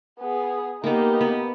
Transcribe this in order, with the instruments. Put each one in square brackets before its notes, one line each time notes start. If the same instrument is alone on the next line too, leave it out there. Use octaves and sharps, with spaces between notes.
[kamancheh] B3 G#4
[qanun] A#3 B3 [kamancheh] D#4 G4
[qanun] B3